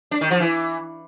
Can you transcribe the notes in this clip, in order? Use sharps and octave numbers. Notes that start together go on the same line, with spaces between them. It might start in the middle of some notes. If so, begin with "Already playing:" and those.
D4
D#3
F3
E3